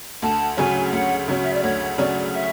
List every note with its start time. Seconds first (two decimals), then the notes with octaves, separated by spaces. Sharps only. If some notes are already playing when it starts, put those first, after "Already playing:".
0.22 D2 A5
0.57 C#3 F#3 C#4 G#5
0.93 D2 F#5
1.28 C#3 F#3 C#4
1.44 E5
1.53 D5
1.63 D2 C#5
1.98 C#3 F#3 C#4 D5
2.34 E5